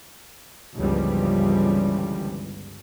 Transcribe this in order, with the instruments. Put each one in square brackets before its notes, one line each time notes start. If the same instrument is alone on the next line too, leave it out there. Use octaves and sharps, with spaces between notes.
[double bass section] G1 C#2 E3 F3 G3